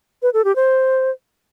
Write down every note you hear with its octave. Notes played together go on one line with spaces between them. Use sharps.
B4
A4
G4
C5